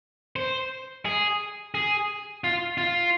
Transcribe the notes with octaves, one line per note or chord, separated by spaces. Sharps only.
C5
G#4
G#4
F4
F4